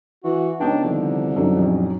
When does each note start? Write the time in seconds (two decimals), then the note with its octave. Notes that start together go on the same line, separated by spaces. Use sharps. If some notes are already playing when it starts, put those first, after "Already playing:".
0.24 E3 F#4
0.60 C#2 B3 D4 D#4 C#5 D#5 G5 A5
0.84 C2 D3 D#3 F3
1.36 F#2 F#3 D#4 A4
1.57 A#1 F2